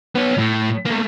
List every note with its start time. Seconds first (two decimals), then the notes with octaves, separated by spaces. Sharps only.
0.15 B3 C#5
0.38 A2
0.85 A3 A#3